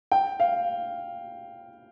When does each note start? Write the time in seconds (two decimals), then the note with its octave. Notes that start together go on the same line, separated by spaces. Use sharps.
0.12 G5
0.40 F5